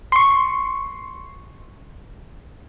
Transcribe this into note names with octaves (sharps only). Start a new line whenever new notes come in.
C6 C#6